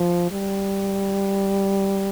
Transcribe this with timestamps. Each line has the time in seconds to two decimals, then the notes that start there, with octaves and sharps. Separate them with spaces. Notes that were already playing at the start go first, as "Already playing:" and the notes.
Already playing: F3
0.31 G3